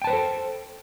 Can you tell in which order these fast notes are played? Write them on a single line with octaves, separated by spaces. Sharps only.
G5 A5 B4 C5 A4